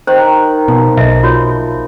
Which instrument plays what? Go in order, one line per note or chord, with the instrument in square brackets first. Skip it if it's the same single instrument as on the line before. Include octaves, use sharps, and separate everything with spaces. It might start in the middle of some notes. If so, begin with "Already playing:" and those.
[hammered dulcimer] D#3 [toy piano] C5
[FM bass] B2 [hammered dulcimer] F3
[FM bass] B1 [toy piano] D#5 E5
[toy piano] F4 F#4 C#5